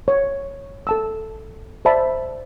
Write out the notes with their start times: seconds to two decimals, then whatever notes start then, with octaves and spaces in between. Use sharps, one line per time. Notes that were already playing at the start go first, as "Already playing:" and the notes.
0.08 C#5
0.87 A4 A5 E6
1.85 C5 D5 E5 A5 B5